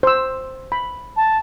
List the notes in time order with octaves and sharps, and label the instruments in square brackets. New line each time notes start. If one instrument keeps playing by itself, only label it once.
[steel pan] C5 E6
B5
[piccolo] A5